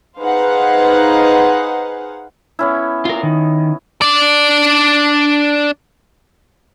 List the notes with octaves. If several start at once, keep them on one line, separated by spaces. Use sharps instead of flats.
D#4 G#4 B4 C5 F5 F#5
B3 C#4 E4
F4 A#4
D#3
D4 D5